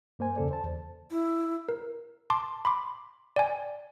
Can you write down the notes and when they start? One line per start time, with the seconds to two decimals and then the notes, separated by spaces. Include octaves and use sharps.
0.19 G2 A#3 C5 G#5
0.36 E2 C#3 A4 D5
0.51 C5 A5
0.64 E2
1.11 E4
1.69 A#4
2.30 A5 C6 D6
2.65 B5 C6 D6
3.36 D5 G5 G#5